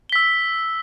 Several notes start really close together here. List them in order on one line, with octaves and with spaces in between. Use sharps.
G7 B6 E6